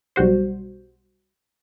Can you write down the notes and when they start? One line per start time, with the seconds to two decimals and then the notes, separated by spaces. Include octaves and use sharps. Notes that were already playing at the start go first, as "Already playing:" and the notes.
0.16 B1 G3 F#4 C5